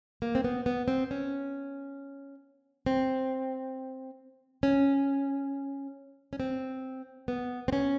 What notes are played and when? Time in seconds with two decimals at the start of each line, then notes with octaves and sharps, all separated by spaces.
0.22 A#3
0.35 C4
0.44 B3
0.66 B3
0.88 C4
1.11 C#4
2.86 C4
4.63 C#4
6.33 C#4
6.40 C4
7.28 B3
7.68 C4
7.73 C#4